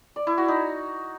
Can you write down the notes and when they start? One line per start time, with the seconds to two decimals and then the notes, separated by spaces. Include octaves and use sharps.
0.16 D5
0.27 E4
0.38 F#4
0.48 D#4